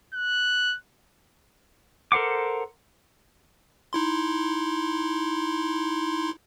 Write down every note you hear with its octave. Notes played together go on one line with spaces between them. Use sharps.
F#6
A4 A#4 C5 F#5 D6
D#4 E4 C6